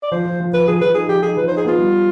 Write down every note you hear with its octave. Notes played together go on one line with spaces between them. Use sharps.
D5
F3 C5
F3
F3
F3 B4
F3 G#4
F3 B4
D#4 G#4
F3 G4
D#4 G#4
F3 B4
C5
D#4
G#4
B3 F4
G3